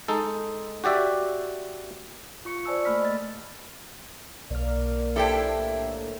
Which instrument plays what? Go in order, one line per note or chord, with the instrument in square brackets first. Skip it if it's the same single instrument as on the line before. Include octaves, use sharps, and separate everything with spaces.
[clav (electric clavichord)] G#3 D#4 A4
F#4 G4 D5 E5
[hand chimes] F4 C#6 C#7
C5 D5 G#5 A5 E6
A3 A#3 B5 F6 B6
D#5 A6
[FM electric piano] B1 F6 [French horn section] A#3 D5
[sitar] D4 E4 G4 [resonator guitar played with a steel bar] A4 C5 G5
[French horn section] A2 D3 A#3